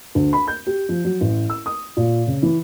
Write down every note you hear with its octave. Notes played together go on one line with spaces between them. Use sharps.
D2
B5
G6
G4
F3
F#3
A1
E6
D#6
A#2
C#3
E3